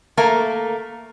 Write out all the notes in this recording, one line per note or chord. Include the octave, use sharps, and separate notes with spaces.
A3 A#3 A#4